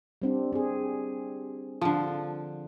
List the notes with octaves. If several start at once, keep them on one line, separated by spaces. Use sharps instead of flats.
G3 C4 D4
C4 G#4
D3 F3